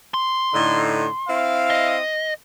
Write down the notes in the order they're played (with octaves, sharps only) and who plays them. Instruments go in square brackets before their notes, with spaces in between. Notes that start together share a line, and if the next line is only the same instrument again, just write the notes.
[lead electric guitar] C6
[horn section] A2 D3 D#4
C4 E4 F5
[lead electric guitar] D#5